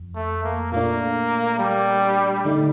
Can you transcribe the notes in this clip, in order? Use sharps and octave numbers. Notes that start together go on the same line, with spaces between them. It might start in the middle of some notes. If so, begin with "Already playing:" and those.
Already playing: F2
A3
A#3
A#2 A3 A#3 D4
G3
D3 A3 D#4